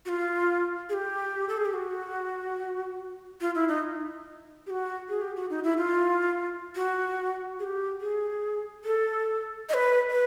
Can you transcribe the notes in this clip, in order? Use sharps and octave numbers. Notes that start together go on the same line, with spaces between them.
F#4
F4
G#4
G4
A4
G#4
G4
F#4
F4
E4
D#4
G4
F#4
G#4
G4
F#4
D#4
E4
F4
F#4
G#4
G4
G#4
A4
D#5
B4
B4